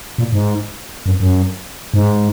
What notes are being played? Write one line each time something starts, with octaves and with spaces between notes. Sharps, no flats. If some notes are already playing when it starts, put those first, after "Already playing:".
A#2
G#2
F#2
F#2
G#2